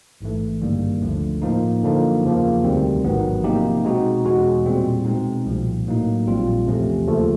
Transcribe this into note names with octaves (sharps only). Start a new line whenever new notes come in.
A1 G#2 E3 A3
G1 G2 D#3 G3 A#3
D2 D3 F3 A3
A2 F3 A#3 D#4
F#2 D3 F3 A#3 D#4
E2 C#3 F3 A#3
D2 C3 D#3 G3 C4
A1 G#2 D#3 F#3 B3
C3 F3 A#3 D#4 G4
B2 G#3 C4 D#4 F#4
E2 B2 G#3 C#4 F#4
A#2 G3 C4
B2 G#3 C4 D#4
C2 A#2 F3
A2 F#3 A#3 D#4
A#1 A#2 G3 C4 F4
E2 C3 F3 A3 C#4
D#2 C#3 F3 A3